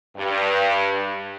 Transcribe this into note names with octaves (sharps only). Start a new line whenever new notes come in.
G2